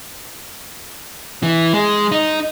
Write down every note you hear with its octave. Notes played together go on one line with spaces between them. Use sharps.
E3
G#3
D#4